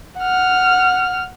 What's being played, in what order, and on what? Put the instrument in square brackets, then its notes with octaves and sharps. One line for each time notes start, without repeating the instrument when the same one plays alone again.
[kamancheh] F#5 F6